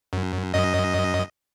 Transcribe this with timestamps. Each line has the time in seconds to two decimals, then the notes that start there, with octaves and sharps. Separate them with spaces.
0.13 F#2
0.54 F#2 D#5